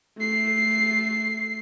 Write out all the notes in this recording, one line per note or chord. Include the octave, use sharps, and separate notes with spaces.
A3 C7